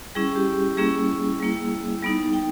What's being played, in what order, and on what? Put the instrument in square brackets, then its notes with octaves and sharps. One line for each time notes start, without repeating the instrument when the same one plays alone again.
[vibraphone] G3 C#4 E4 G#4
G4
G3 A#3 C#4 E4 G#4
G3 A#3 E4
G3 B3 D#4
G5